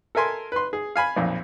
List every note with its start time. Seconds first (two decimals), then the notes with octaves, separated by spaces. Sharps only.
0.15 A4 A#4 E5 G#5 C6
0.52 B4 C6
0.73 G#4
0.96 F5 G#5 B5
1.16 B1 F2 A#2